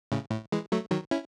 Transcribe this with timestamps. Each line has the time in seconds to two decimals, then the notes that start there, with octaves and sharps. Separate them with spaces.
0.12 A2 C#3
0.31 A2
0.52 E3 G#3
0.72 F#3 A3
0.91 D#3 F#3
1.11 C#4 E4